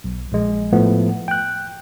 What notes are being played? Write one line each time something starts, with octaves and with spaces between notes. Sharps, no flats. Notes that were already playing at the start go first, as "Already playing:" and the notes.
B1
A#1 G#3
A2 F3 A3 B3
G5 F#6